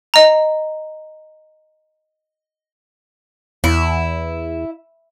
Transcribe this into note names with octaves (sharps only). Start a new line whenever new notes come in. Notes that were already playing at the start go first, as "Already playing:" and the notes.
D#5 A#5
E2 E4